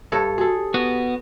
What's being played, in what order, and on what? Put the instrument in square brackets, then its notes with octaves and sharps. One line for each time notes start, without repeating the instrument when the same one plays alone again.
[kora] G2 A4 C#5
[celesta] F#4 [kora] G#4 A4
[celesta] G4
[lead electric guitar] B3 F#4